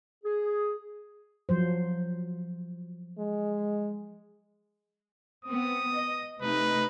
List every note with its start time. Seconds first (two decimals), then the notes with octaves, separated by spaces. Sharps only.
0.24 G#4
1.49 F3 F#3 C5
3.18 G#3
5.45 B3 C4 D#6
5.91 D#5
6.41 C3 A3 D#4 B4